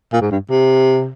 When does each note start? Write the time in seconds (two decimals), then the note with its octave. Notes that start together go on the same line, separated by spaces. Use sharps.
0.12 A#2
0.21 G#2
0.31 G2
0.50 C3